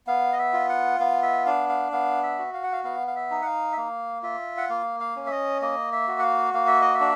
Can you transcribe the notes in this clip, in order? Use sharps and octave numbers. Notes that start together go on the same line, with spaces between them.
B3 F5
D#5
E5
F4
F#5
B3 F5
E5
D4 F5
F5
B3 F5
E5
F#4
F5
F#5
F5
B3 F5
F5
E5
D#4
F#5
F5
E5
A#3 F5
F4 E5
F#5
A#3 F5
F5
C#4
E5
D#5
A#3 D#5
E5
F#4
F#5
F5
A#3 F5
E5
D#5
E5
D4